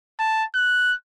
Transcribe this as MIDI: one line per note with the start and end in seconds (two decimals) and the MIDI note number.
0.19 0.44 81
0.55 0.94 90